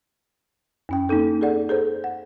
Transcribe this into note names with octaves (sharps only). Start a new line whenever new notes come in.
F#2 C#4 G5
A#3 C4 D#4 A4
G#4 A4 D5 F#5
G#4 A4 C5
F#5